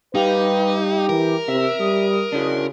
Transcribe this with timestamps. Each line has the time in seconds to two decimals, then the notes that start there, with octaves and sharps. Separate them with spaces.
0.15 G3 D#4 G4 B4 F5
1.09 E3 A#4
1.48 C3 E5 E6
1.80 G3 D#6
2.32 C#3 D4 E4 F#4